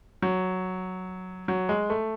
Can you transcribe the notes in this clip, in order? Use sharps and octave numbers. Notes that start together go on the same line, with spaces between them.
F#3
F#3
G#3
A3